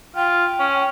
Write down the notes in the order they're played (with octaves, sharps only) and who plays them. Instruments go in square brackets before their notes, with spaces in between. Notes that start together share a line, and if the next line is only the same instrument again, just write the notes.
[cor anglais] F4 [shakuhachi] G5
[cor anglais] C#4